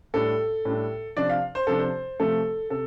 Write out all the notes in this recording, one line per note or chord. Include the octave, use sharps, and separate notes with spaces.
A2 G3 D4 A4
A2 G3 D4
C3 F3 D4 D5
F5
C5
C3 F3 D4 A4
C5
C3 F3 A3 A4
C3 A4